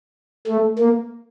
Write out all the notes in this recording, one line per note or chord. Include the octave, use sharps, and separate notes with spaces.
A3
A#3